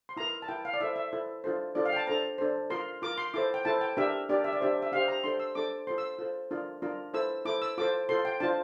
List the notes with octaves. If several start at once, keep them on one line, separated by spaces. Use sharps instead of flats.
C6
E4 A#4 A#5
A5
E4 A#4 G5
F5
D5
E4 A4 C5 E5
E5
E4 A4 C5
D4 F4 A4 C5
D4 F4 A4 C5 D5
F5
G5
A5
D4 A4 C5 A#5
D4 A4 C5
F4 A#4 C6
F4 A#4 D6
C6
E4 A4 C5 D6
G5
E4 A4 C5 A5
G5
D4 G4 A#4 E5
D4 G4 A#4 D5
E5
D5
D4 G4 C5 E5
E5
D4 G4 C5 F5
A#5
D4 A4 C5 C6
E6
D4 A4 C5 D6
F4 A4 C5 C6
E6
F4 A4 C5
D4 F4 A#4
D4 F4 A#4
E4 A4 C5 E6
E4 A4 C5 D6
E6
F4 A4 C5 D6
F4 A4 C5 C6
G5
D4 F4 C5 A5